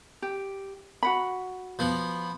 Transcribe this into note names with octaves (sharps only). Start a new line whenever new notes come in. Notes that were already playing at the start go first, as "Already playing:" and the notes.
G4
F#4 F#5 B5
F3 B3